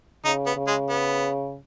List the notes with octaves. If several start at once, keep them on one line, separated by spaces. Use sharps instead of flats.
C#3 D#4
B3
C#3
G#3
B3